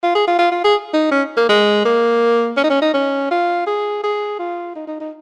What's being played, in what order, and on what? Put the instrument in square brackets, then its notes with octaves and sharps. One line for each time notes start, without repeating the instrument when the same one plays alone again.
[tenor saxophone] F4
G#4
F4
F4
F4
G#4
D#4
C#4
A#3
G#3
A#3
C#4
D#4
C#4
D#4
C#4
F4
G#4
G#4
F4
D#4
D#4
D#4